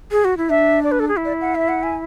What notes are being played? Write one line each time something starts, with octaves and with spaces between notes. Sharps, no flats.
G#4
F#4
E4
D4 E5
D5
B4
A4
G#4
E4
D5
F#5
E5
F#5
G#5